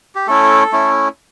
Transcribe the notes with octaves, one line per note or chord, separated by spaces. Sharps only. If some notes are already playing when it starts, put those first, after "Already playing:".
G4
A3 C#4 E4 A4
A3 C#4 E4